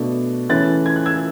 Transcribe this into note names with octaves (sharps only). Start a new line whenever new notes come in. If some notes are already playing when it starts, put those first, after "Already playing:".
Already playing: B2 A3 D4
C#3 E3 A3 C#4 F#6 A6
G#6
F#6
E6 G#6